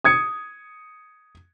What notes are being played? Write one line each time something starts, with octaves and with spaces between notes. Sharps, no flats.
D#6 G#6 C#7